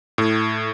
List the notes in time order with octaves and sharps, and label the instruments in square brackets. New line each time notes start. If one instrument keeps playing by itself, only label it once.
[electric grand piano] A2